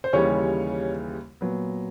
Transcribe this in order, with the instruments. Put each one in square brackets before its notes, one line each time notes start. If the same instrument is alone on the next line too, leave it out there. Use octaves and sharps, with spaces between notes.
[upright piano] C5
D#2 C#3 E3 G3 C#4 C#5
A#2 F#3 B3